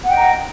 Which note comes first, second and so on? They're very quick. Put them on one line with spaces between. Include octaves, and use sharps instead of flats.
F#5 G5 D#5 A#5